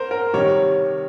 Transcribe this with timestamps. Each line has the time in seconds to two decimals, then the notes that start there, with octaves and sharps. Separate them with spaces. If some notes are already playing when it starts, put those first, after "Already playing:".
Already playing: A#4 C5
0.11 A#4
0.33 C3 D#3 G3 C#5